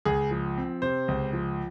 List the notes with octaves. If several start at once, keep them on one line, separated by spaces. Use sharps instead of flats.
C#2 G#4
F3
C4
C3 C5
C#2
F3